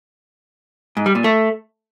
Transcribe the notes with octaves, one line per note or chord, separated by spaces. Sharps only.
G#2
G3
A#2
A3